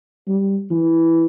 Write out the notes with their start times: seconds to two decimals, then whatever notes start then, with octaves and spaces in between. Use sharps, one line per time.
0.28 G3
0.71 E3